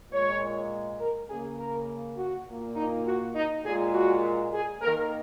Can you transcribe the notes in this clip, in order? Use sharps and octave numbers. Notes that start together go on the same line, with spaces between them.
A#2 G#3 C#5
A#4
C#3 A#3 G#4
A#4
F#4
A#2 A#3
D#4
F#4
D#4
A#2 G#3 G#4
F#4
G#4
D#3 A#3 A#4